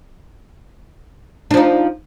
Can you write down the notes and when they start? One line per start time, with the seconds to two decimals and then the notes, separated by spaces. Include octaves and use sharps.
1.51 D4
1.54 F3
1.57 D#4